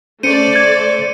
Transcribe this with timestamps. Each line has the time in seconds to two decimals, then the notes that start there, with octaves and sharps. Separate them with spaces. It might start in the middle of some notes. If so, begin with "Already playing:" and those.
0.23 A3 C#4 C5 D5 C#7 D#7
0.56 G#6